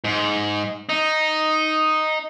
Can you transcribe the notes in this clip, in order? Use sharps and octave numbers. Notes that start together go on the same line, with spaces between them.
G#2
D#4